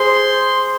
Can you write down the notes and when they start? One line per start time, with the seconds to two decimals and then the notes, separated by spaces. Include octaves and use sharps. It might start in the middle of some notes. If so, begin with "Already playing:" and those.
Already playing: G#4 C5 C6